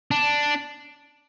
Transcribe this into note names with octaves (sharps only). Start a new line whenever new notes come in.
D4